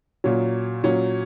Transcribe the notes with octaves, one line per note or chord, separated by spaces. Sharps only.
A#2 F#3 C#4
A#2 F#3 C#4